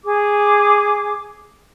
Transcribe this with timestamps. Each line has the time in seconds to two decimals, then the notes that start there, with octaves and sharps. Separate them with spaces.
0.04 G#4 D6